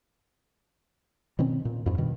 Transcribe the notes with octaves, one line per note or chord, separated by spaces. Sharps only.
B2 D#3 C4 C#4
A#2
F2 G#2
G2 B2 D#3